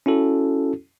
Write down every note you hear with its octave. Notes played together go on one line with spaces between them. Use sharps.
C#4 E4 F#4 A4